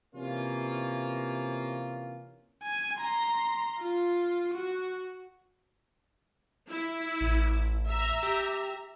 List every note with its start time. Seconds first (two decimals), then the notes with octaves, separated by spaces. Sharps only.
0.15 C3 E3 A#3 C#4 F4
2.63 G#5
2.99 A#5 C6
3.79 F4
4.54 F#4
6.69 E4
7.21 A1
7.88 E5 A#5
8.23 G4